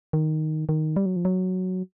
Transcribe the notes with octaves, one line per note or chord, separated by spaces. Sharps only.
D#3
D#3
G3
F#3
F3
F#3